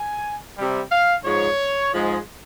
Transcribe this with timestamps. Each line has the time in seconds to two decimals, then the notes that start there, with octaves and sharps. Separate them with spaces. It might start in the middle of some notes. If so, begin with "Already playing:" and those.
Already playing: G#5
0.56 G3
0.61 C3
0.90 F5
1.24 G#2 F3 G#3 C#5
1.93 G#2 F3 G#3